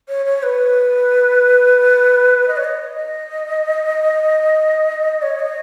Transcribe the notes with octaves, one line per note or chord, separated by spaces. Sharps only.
C#5
C#5
B4
D#5
C#5
D#5
C#5
D#5